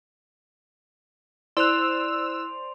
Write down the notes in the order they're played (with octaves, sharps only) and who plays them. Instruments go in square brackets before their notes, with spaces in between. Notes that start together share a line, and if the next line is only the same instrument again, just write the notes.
[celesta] E4 F#6 [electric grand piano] C5 D5 [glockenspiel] C6 F7 [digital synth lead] E6